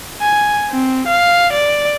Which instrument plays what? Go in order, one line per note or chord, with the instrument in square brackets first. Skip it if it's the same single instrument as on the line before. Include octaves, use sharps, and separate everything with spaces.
[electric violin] G#5
C4
F5
D5